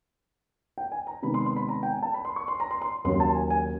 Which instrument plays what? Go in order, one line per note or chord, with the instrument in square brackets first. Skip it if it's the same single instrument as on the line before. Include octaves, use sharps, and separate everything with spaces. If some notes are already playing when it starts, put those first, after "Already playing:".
[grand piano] G5
G#5
A#5
C3 D#3 G#3 B3 D#4 B5
C6
C6
B5
A#5
G5
G#5
A5
B5
C6
C#6
C6
A#5
C6
C6
D#2 C#3 F#3 A#3 C6
A5
G#5
G#5